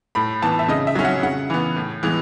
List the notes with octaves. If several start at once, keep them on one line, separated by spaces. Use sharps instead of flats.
A2 B5
E3 B3 A5
E5
C#3 D#5
E5
F#3 C#4
F#5
C#3 F#5
E3 B3
A2
E3 G#3 B3